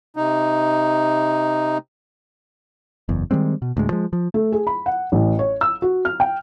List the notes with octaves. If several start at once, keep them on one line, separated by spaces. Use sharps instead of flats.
C3 D#4
F#1 E2
D#3 G3 G#3 C4
B2
D2 A2 G#3
F3 G#3
F3
A3
G#4
B5
F#5
A1
C#5
E6
F#4
F6
G5